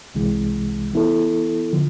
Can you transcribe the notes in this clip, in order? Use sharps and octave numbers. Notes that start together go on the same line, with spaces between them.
C2 C3 E3 G#3
E3 B3 E4 A4
D3 F3